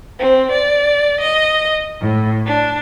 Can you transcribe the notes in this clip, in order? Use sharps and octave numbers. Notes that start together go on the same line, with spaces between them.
C4
D5
D#5
A2
D4